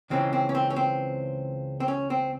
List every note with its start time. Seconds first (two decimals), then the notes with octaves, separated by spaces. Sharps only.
0.10 C#2 C#3 E3 G#3 C4
0.33 C4
0.49 C#4
0.55 C4
0.70 C#4
0.76 C4
1.80 C4
1.88 C#4
2.10 C4